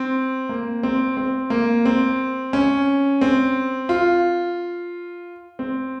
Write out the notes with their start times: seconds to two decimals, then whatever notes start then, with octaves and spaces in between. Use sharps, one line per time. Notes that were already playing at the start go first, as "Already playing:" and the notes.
Already playing: C4
0.49 A#3
0.83 C4
1.17 C4
1.50 A#3
1.85 C4
2.53 C#4
3.21 C4
3.89 F4
5.59 C4